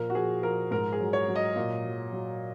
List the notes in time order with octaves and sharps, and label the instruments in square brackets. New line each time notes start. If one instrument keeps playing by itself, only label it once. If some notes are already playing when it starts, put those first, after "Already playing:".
Already playing: [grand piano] A#2 F3 A#4
F#4
F3 G#4
F3 A#4
G#2 A#4
G#4
F#3
C#5
F#3
D#5
A#2
F#3
F#3